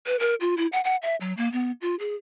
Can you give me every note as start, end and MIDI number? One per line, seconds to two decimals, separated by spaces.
0.06 0.19 71
0.19 0.35 70
0.41 0.55 65
0.57 0.67 64
0.73 0.81 78
0.84 0.96 78
1.02 1.16 76
1.21 1.33 54
1.37 1.51 58
1.52 1.72 59
1.81 1.95 65
2.00 2.15 68